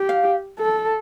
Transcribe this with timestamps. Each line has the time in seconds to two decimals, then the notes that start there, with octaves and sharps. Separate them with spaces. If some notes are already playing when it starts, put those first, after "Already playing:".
Already playing: G4
0.09 F5
0.59 A4